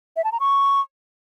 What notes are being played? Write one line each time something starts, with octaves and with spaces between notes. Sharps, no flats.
E5
A5
A#5
C#6